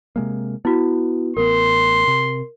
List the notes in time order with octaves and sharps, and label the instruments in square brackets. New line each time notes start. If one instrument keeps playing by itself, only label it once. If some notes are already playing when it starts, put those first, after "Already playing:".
[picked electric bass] C3 G#3 A#3
[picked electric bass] B3 [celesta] E4 F#4
[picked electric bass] A1 B3 [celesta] A#4 [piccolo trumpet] C6
[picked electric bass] C3